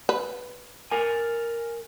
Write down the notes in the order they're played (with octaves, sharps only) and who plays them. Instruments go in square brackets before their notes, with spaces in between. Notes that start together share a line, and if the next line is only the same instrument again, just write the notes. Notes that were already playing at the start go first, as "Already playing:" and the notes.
[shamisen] B4
[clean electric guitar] A#4 G#5